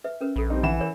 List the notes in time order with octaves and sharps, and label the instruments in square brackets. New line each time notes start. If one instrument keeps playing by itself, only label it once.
[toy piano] B4 E5
C#4 A#4 B4
[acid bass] A#1 [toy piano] A4 B5
[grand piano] G3 C4 D#4
[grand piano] E3 E7 [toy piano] E5 F#5 B5
[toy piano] A#4 C#5